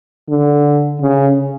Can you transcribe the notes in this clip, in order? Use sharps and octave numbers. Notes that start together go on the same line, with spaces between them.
D3
C#3